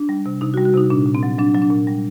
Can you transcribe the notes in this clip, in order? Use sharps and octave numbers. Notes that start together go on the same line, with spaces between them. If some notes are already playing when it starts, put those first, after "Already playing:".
Already playing: D4
G3
C3
C3 D#4
F#4
G3
F#4
C3 D#4
A#2 D4
A#2
C4
F#3
F#3 D4
F#3
D4
A#2
G3